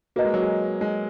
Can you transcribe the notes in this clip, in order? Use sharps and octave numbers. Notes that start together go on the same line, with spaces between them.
A#3 F#4 B4 D#5 A#5
G#3
F#3
G#3
G#3